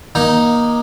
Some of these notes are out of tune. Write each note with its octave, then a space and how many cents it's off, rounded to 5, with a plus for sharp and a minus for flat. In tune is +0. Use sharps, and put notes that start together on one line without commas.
A#3 +25 D#4 +0